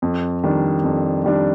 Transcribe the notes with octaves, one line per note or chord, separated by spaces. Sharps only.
F2
D#3 G3 D4
F2
D#3 G3 D4